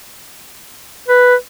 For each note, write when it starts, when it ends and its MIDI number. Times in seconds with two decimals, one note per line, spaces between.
1.08 1.35 71